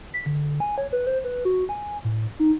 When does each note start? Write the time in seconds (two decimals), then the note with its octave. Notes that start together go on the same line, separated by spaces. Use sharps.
0.14 B6
0.26 D3
0.60 G#5
0.78 C#5
0.92 B4
1.07 C5
1.24 B4
1.45 F#4
1.69 G#5
2.04 A2
2.40 D#4